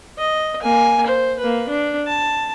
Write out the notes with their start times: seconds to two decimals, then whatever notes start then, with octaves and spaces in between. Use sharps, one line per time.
0.19 D#5
0.62 A#3 G#5
1.06 C5
1.39 A#3 B4
1.69 D4
2.07 A5